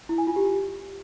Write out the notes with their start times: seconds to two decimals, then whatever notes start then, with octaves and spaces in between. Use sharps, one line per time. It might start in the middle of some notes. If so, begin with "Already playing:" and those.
0.09 E4
0.18 G#5
0.27 F4
0.36 G4